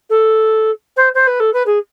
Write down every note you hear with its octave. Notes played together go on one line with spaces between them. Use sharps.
A4
C5
C5
B4
A4
B4
G#4